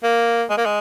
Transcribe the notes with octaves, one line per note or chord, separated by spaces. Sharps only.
A#3
G#3
A#3
G#3